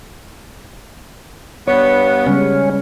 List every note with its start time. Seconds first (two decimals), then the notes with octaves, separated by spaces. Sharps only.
1.68 G2 B3 C#5
2.27 C#3 G3 G#3 C#4